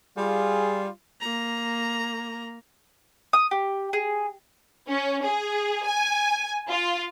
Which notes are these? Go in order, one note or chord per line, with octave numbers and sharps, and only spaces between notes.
G3 F4 G#4
A#3 A#5
D#6
G4
G#4
C#4
G#4
G#5
F4